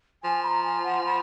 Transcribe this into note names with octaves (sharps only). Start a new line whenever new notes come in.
F3 G#5
B5
A#5
G#5
F#5
B5